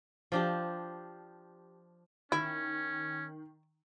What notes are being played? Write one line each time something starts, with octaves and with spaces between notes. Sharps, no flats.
F3 D4 G4
D#3 C#4 E4